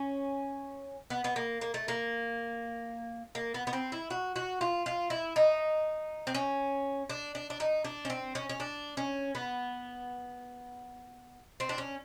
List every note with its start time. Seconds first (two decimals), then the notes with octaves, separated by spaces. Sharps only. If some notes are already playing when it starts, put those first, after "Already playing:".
Already playing: C#4
1.10 B3
1.24 B3
1.36 A#3
1.61 A#3
1.74 A3
1.88 A#3
3.35 A#3
3.54 B3
3.67 B3
3.73 C4
3.92 E4
4.10 F#4
4.36 F#4
4.61 F4
4.86 F4
5.10 E4
5.36 D#4
6.27 C4
6.35 C#4
7.10 D4
7.35 D4
7.50 D4
7.60 D#4
7.85 D4
8.05 C#4
8.10 C4
8.35 C#4
8.49 C#4
8.60 D4
8.97 C#4
9.35 B3
11.60 C4
11.69 D4
11.78 C#4